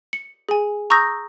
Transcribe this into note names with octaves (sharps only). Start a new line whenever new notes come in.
C#7
G#4 G#5
A#5 C#6 D#6 E6 G6 A#6